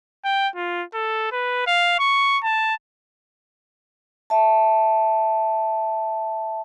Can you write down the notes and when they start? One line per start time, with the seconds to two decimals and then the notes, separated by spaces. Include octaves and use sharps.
0.25 G5
0.56 F4
0.94 A4
1.32 B4
1.67 F5
1.99 C#6
2.44 A5
4.30 E5 A5